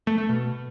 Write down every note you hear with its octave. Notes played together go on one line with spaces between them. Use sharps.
A3
A3
B2